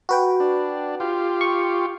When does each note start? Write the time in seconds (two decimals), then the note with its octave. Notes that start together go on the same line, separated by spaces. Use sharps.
0.09 F#4 B4 G5
0.40 D4
1.00 F4 G4
1.41 C#6